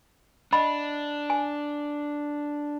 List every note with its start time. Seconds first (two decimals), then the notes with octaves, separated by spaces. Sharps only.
0.53 D4 D#5 F#5 B5
1.30 G#5